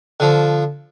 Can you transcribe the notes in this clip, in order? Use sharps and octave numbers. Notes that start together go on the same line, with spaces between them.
D3 F3